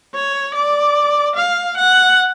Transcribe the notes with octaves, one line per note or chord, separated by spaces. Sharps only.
C#5
D5
F5
F#5